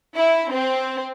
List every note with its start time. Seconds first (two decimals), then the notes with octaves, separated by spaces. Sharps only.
0.16 E4
0.52 C4